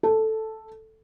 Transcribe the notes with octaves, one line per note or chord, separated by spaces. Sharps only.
A4